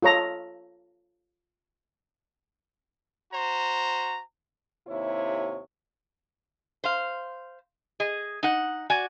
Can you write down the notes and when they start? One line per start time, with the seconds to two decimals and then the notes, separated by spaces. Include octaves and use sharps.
0.02 F4 A4 C#5 A#5
3.33 F#4 C5 A#5
4.88 D#2 C3 E4 C#5
6.84 C5 F5
8.00 G#4 D#5
8.43 D#4 F#5
8.90 F#4 D5 G#5